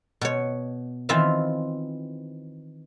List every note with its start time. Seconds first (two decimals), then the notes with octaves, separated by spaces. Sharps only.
0.21 B2 C#5
1.09 D#3 E3 C4 F4 E5 F5